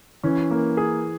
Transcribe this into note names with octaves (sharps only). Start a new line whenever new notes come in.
E3 C#4
A#3
G#4